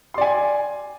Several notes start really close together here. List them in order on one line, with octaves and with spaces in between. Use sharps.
C6 D5 G#5